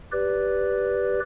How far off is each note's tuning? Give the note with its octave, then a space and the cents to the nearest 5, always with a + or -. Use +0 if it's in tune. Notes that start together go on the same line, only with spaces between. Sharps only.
G4 +0 B4 +0 D5 -10